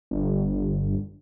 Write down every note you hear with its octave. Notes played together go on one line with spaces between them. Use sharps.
G1